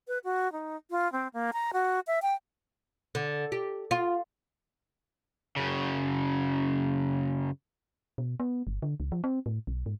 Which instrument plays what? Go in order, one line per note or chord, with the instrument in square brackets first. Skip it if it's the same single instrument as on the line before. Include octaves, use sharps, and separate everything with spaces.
[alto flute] B4
F#4
D#4
F4
C4
A#3
A#5
F#4
E5
G5
[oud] D3
G4
F4
[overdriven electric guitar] F#2 C#3
[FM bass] B2
B3
G1
D3
C#2
F3
C4
A2
B1
G#2